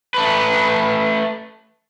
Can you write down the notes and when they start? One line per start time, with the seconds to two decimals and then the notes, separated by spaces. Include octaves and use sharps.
0.14 A3 B4